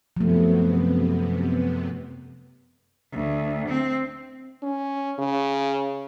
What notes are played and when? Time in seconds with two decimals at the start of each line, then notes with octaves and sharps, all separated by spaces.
0.17 F#2 C3 F3 A3 B3
3.12 D2
3.68 C4
4.63 C#4
5.19 C#3